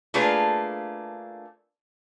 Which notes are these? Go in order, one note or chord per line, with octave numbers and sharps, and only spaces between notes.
A3 A#3 D4 F4 G#4 B4